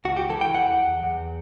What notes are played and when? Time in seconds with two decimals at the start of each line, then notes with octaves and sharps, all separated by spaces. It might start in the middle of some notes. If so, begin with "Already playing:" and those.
0.05 C#2 F#4
0.17 G4
0.30 E3 A4
0.41 G5
0.54 E2 F#5
0.79 E2
1.03 E2